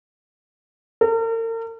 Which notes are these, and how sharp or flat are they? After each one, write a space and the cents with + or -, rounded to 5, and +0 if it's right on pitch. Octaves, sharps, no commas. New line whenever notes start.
A#4 -40